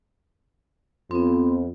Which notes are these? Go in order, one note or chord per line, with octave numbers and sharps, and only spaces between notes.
F2 B3 C4